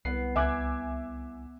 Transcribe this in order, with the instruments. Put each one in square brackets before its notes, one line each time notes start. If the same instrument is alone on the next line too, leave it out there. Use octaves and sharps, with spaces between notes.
[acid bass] C2 [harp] B3 [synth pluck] C7
[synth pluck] C#2 F#6 G#6 [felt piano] E5 G#5 D6